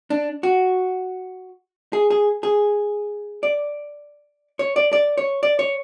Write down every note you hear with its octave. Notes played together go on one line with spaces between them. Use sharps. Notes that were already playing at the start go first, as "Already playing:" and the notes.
D4
F#4
G#4
G#4
G#4
D5
C#5
D5
D5
C#5
D5
C#5